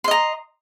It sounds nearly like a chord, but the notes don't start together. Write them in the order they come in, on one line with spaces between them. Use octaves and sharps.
C6 D#5 A#5